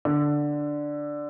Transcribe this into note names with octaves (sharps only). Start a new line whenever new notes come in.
D3